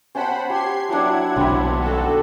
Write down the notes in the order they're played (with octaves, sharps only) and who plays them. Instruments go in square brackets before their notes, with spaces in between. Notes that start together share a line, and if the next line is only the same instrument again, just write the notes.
[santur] C#4 G5 A5 [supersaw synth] C5 F#5 B5
[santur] G4 [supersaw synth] C6 G#6 C7
[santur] F#3 D4 [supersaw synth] E4 F#5 G#6
[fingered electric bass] B1 D#3 D4 [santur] C4 B5
[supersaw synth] F#4 A4